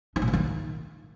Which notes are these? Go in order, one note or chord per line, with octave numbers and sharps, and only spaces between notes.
D#4
A#2
D3
D#3